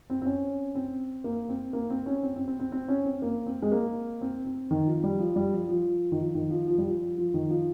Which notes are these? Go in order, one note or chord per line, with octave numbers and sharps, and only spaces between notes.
C4
C4
C#4
C4
A#3
C4
A#3
C4
C#4
C4
C4
C4
C4
C4
C#4
C4
A#3
C4
G#3
A#3
C4
C4
D#3
F3
G3
F3
G3
F3
F3
D#3
F3
D#3
F3
F3
G3
F3
F3
D#3
F3